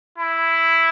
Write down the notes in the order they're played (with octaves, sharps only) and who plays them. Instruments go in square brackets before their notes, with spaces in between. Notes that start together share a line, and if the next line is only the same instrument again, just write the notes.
[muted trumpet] E4